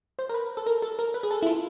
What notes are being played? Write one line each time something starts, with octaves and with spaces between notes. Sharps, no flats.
C5
A#4
B4
A4
A#4
A4
A#4
B4
G#4
A4
E4
F4